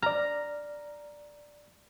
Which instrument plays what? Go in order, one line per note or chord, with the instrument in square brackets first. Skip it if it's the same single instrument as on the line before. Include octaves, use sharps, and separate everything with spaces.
[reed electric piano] D5 F6 [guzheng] A#5